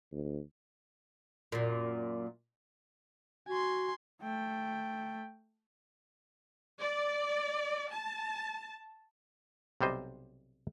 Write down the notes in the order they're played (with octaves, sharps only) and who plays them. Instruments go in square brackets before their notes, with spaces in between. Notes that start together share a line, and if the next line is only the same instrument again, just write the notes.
[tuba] D2
[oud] F#2 A#2
[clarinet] F#4 [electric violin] G#5 C6
[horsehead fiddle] A3 G5
[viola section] D5
A5
[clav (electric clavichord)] B1 C3 G3 C5 D#5